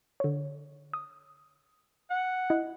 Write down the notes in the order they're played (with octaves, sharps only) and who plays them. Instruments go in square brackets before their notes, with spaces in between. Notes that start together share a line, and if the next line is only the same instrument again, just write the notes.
[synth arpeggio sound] D3 C#5
D#6
[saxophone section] F#5
[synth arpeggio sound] E4 D#5